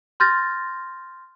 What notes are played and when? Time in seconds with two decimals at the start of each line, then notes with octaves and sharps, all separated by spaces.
0.20 C6 F6 G6 A6 A#6